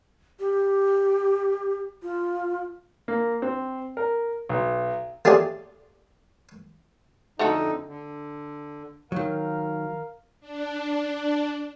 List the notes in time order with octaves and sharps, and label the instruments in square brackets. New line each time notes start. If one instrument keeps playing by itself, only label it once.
[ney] G4
F4
[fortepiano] A#3
C4
A#4
B1
[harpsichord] A3 F4 G4 G#4 D5
[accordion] F2 D3 D#4 [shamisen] A3 F#4 A4
[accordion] D3
[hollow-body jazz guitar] D#3 F#3 [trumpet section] A#4 F5
[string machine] D4